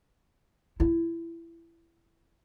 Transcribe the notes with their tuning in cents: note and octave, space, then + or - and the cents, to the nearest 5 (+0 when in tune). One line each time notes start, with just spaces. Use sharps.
E4 +20